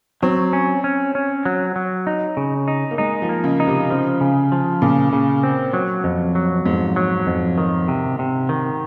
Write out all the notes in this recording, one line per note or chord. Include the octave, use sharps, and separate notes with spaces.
F#3 C4
C#4
C#4
C#4
F#3
F#3
D#4
C#3
D#4
A#3
G#3 D#4
F3
A#3
C#3
D#4
C3
C#3 F3
C#3
F3
A#2 C#3
C#3
C4
F#3
F2
F#3
F2 G#2
F#3
F2
D#3
C3
C3
D#3